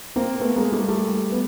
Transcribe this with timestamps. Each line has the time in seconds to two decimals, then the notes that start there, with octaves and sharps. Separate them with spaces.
0.16 A#3 C4
0.40 A3 B3
0.56 G#3 A#3
0.72 G3 A3
0.88 G3 A3
1.32 B3